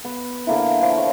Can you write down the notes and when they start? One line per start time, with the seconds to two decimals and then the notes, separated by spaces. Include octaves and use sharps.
0.05 B3
0.47 D3 A#3 E4
0.82 F3 F4 B4 D6
0.97 C#5